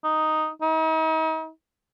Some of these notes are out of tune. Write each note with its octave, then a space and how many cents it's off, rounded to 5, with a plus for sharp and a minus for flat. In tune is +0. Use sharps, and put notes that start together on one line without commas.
D#4 +0
D#4 +40